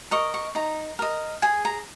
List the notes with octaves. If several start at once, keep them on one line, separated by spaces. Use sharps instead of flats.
A#4 D#5 C#6
C#6
D#4 A#5
A#4 D#5
G#4 G#5
A#5